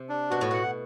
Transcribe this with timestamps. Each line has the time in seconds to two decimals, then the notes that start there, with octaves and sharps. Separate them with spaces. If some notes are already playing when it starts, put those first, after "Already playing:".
Already playing: C3
0.09 D4
0.30 B2 F#4
0.41 A2
0.51 B2 F#5